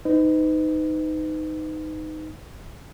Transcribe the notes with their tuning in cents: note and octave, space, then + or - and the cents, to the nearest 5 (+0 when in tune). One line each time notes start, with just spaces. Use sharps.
D#4 +0 B4 +35